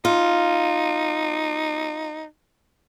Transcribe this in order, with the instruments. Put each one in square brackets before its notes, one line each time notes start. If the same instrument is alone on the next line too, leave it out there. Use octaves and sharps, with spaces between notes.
[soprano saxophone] D#4 [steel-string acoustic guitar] F4